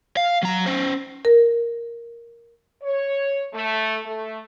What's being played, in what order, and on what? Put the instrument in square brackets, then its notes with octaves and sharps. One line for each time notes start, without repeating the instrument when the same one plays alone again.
[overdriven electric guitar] F5
F#3 A#5
C#4 C5
[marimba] A#4
[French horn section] C#5
A3
A3